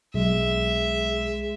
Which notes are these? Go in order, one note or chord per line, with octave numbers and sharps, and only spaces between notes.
B1 G#3 E5